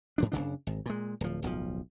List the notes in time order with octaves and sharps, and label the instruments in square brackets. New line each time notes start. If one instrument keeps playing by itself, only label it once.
[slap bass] G#2 F3 D4
F#1 C#2 C#3 D4
G#1
A#2 G#3
D1 F3
D1 B1 A#2 F3